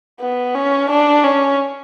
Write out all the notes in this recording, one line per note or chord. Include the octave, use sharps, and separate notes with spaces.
B3
C#4
D4
C#4